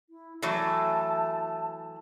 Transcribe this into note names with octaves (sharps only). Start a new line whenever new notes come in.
E4
E3 F#3 A3 A5